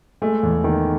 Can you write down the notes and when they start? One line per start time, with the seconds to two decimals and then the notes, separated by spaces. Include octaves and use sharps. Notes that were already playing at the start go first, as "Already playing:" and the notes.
0.22 G#3 A3
0.43 E2
0.64 D#3